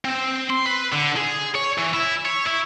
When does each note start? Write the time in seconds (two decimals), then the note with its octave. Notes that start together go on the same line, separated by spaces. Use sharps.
0.05 C4
0.50 C6
0.66 B4
0.92 D3
1.17 G#4
1.55 C#5
1.78 E3
1.94 E4
2.26 C#5
2.46 E4